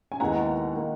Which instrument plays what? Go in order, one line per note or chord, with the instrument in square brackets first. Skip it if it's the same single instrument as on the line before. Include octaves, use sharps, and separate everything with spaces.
[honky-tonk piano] G#5
[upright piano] D#2 D#3 G#3 B3 E4 [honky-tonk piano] F#5 A#5
[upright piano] D#3 A#3